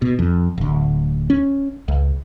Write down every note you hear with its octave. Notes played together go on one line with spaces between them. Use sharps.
B2
F2
D1 D2
C#4
C#2